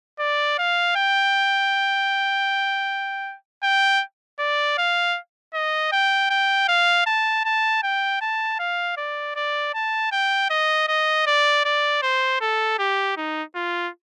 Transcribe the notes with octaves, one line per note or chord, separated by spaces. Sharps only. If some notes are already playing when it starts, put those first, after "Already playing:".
D5
F5
G5
G5
D5
F5
D#5
G5
G5
F5
A5
A5
G5
A5
F5
D5
D5
A5
G5
D#5
D#5
D5
D5
C5
A4
G4
D#4
F4